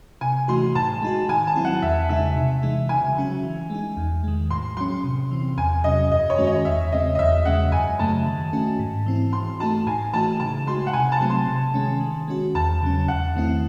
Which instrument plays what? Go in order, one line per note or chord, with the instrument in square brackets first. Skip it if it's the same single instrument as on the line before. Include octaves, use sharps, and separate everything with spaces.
[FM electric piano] C3 [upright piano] G#5
[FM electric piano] E3 A3 D#4 F#4 [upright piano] C6
[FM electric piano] A2 [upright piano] A5
[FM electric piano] G#3 D#4 F#4
[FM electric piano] D#3 [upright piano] G#5
[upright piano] A5
[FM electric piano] F#3 C4 E4
[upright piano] F#5
[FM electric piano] E2 [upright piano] E5
[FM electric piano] C#3 G#3 D#4 [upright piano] E5
[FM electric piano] C3
E3 G#3 D#4
[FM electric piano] C#3 [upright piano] G#5
[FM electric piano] F#3 C#4 F#4
E3
G#3 D#4
E2
D#3 G#3
[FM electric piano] A2 [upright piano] C6
[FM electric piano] F#3 C#4 [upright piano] C6
[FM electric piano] C3
E3 C4
[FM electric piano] E2 [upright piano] G#5
[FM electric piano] C3 F#3 C#4 [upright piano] D#5
[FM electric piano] F#2 [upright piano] D#5
[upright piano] C#5
[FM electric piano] D#3 G#3 C#4 F#4
[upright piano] D#5
[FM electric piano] E2 [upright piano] E5
[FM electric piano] C#3 G#3 C4 [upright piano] D#5
[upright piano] D#5
[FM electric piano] E2 [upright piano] E5
[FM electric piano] C#3 G#3 C#4 [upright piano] F#5
[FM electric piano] F#2 [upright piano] G#5
[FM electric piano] C#3 F#3 A3 [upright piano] A5
[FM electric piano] D#3
A3 C#4 F#4
G#2
E3 C4 E4
[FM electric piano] E3 [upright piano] C6
[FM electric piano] A3 D#4 F#4 [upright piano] A5
[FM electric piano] A2 [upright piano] G#5
[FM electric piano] E3 A3 D#4 F#4 [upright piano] A5
[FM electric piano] C#3 [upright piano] A5
[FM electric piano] G#3 D#4 F#4 [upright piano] C6
[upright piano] F#5
[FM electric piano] C3 [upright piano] G#5
[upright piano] A5
[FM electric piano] F#3 A3 C4
[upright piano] C6
[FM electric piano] C3
D#3 G#3 C#4
D#3
G#3 C#4 F#4
[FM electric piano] E2 [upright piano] A5
[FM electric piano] C#3 F#3 C#4
[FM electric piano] E2 [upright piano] F#5
[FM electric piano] D#3 A3 C4 E4